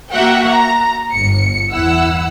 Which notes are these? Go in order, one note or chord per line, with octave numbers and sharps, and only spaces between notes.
A#3 F#4 E5 F#5 G5
A#5
G1 C#7
E2 E4 F#5 E6